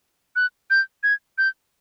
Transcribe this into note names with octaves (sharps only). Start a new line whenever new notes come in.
F#6
G6
G#6
G6